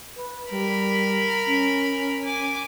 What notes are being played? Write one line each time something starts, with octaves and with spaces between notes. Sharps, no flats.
B4
G3 A#4 B5
C#4
G#5 D6